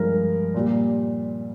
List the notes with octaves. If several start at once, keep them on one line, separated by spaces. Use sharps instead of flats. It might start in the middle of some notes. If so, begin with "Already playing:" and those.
Already playing: G2 F3 G#3 A#4
A#2 G3